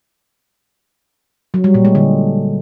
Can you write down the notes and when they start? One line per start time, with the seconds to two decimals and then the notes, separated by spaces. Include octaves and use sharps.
1.54 F#3
1.64 G3
1.74 A#2
1.85 G#3
1.95 D3